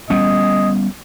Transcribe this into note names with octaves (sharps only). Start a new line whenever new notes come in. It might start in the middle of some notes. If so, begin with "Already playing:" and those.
G3 B3 C#4 D#5